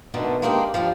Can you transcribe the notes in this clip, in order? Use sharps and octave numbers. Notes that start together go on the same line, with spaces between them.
B2 D3 D#3 A3
G#3 A#3 D4 D#4 F#4 G4
F3 G3 C#4 D4